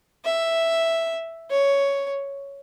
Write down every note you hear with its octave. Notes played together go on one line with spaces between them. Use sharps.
E5
C#5